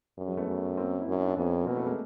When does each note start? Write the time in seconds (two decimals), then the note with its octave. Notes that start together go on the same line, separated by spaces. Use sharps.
0.17 F#2
0.28 F#3 G#3
0.37 A3 B3
0.48 F#2
0.77 A#3 C4
1.01 E4
1.07 F#2
1.14 D#4
1.25 D4
1.37 F2 B3 C#4
1.66 B2 A#3 C4
1.76 A3 B3
1.86 G#3 A#3